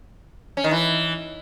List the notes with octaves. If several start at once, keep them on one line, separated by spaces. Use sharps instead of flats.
C#4
D#3
E3